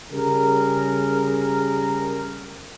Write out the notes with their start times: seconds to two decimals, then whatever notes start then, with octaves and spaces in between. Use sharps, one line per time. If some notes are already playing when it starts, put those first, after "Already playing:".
0.12 C#3 G3 G#4 A#4